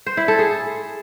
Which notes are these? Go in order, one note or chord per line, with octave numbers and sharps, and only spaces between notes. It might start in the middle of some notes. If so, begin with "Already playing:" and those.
C5
E4
A4
G#4